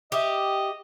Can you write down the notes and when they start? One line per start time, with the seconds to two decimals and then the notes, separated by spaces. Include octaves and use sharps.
0.12 G4 D#5 E5